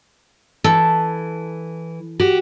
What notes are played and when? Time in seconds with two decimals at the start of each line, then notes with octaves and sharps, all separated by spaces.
0.64 E3 A4
2.20 F#4 G4